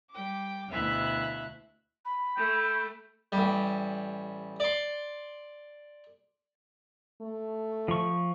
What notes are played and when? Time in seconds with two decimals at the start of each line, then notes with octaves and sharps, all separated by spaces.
0.12 G3 G5 D6
0.71 D2 B2 E4 E5 F5 F#6
2.05 B5
2.36 A3 G5
3.32 A1 G3
4.60 D5 C6
7.22 A3
7.88 F3 C#6